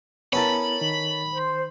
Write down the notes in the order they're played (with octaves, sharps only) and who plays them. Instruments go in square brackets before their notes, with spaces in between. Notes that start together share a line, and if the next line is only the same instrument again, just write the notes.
[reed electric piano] B3 E4 [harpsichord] C#4 A4 A#4 [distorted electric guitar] B5
[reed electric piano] D#3
[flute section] C5